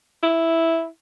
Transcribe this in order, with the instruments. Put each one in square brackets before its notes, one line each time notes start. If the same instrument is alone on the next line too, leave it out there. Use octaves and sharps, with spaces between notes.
[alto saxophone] E4